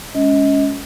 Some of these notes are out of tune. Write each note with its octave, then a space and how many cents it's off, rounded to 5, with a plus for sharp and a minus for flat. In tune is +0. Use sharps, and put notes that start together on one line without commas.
G#3 +0 C#4 +15 D#5 +30